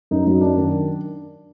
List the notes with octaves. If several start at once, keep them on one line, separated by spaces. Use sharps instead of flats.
F#2 D#4
F#3 D#4
F#2 D4
D#3